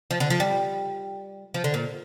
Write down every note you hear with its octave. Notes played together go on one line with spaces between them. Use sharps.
F3
D3
F3
G3
F3
D3
A#2